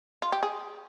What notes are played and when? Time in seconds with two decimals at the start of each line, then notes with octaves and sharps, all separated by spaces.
0.22 F4
0.32 G4
0.43 G#4